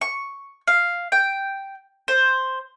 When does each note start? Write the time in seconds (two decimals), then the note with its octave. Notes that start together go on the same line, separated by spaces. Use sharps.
0.01 C#6
0.67 F5
1.12 G5
2.08 C5